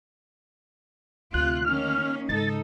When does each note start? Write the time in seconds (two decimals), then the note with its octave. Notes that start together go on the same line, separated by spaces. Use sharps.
1.34 D2 C3 F4 F#6
1.65 D#3 A#3 C#4 F6
2.29 G#2 C#3 D#4 A4 A6